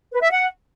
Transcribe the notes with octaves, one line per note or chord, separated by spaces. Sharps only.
B4
E5
F#5